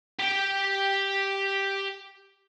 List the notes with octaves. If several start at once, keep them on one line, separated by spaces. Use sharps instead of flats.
G4 G5